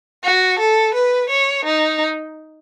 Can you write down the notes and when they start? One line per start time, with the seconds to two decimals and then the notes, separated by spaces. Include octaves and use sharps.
0.24 F#4
0.60 A4
0.95 B4
1.30 C#5
1.65 D#4